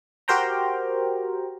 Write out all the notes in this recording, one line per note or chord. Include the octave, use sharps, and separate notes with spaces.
F#4 G4 A#4 C5 G5 A#5